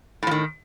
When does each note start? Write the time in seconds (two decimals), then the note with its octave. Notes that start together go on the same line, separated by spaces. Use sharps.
0.23 A2
0.27 F3
0.31 D#3